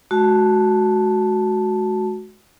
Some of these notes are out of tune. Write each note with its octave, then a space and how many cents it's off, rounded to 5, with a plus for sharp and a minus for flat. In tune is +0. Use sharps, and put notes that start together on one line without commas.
G#3 +45 F#4 +0 A5 +0